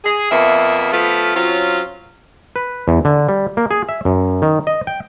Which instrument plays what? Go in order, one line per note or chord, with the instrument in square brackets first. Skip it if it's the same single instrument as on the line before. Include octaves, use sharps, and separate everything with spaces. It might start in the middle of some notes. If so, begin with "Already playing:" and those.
[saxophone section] G#4
F2 A#3 B3 E5
F3 A3 B3 F4
F#3 C4 C#4 F4
[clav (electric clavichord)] B4
E2
D3
G3
A#3
G#4
E5
F#2
D#3
D#5
G5